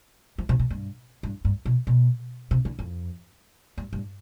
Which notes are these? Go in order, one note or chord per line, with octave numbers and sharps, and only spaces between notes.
F3
C3
B2
G2
G2
G2
B2
B2
C3
D3
F2
G2
G2